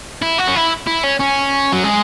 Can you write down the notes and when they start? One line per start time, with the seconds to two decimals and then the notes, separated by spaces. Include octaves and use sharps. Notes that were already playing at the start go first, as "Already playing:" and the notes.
0.22 E4
0.38 F#4
0.48 C#4
0.55 E4
0.87 E4
1.03 C#4
1.19 C#4
1.73 F#3
1.84 G#3